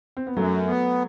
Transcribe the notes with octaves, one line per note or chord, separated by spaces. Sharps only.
C4
B3
F#2 F#3 A3
B3